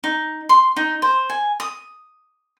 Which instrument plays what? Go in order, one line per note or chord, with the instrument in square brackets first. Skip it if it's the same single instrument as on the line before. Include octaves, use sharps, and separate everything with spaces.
[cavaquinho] D#4
C6
D#4
C5
G#5
D#6